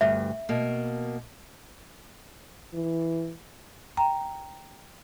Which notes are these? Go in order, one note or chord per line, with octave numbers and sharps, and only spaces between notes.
D2 G2 E5
B2 A#3
E3
G5 A#5